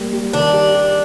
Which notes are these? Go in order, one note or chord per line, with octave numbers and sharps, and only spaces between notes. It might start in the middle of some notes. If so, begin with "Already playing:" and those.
Already playing: G3 A#3
G3
D#3 D4
G4
G4